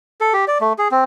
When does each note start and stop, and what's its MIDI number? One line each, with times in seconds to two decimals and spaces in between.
0.21 0.33 69
0.33 0.45 67
0.48 0.58 74
0.61 0.73 57
0.78 0.88 68
0.91 1.04 60